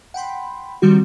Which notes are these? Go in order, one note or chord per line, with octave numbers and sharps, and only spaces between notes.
F#5 G5 B5 C6
D#3 F3 G3 C4 F#4